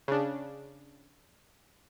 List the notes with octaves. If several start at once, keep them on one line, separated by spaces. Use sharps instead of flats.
C#3 D4